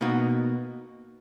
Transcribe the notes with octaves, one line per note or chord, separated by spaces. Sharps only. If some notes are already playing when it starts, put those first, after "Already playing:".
B2 A#3 D#4 F#4